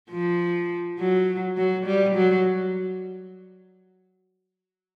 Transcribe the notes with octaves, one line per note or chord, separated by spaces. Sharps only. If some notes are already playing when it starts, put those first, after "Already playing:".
F3
F#3
F#3
G3
F#3